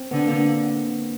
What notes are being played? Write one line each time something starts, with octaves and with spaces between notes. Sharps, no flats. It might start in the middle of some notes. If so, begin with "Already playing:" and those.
Already playing: C4
D3 B3
A#3